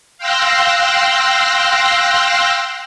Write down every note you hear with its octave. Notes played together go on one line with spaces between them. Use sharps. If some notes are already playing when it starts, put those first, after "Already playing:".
F5 G5 C6 E6 F#6 A#6